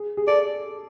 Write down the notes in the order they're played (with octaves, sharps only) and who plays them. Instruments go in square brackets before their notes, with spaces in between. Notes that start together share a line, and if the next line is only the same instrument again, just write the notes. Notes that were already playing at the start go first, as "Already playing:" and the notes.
Already playing: [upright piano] G#4
G#4
[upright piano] A4 [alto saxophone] D5